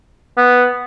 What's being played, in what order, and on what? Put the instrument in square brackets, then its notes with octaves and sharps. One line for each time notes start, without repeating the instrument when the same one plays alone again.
[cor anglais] B3